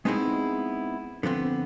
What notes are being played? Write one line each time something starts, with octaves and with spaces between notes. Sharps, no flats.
G#3 B3 C4 D#4 E4 G#4
D3 F3 B3 C4